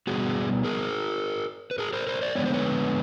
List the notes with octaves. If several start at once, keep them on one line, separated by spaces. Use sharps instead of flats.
B2 G3 B3 F#4 G#4
G#4 A#4
B4
G#4 A#4
A#4 C5
A#4 C5
C5 D5
F2 D3 F3 G#3 B3 C#5
C5
B4 C#5